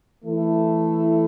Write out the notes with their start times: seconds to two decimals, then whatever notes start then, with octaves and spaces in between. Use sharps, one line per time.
0.24 E3 A3 E4 A4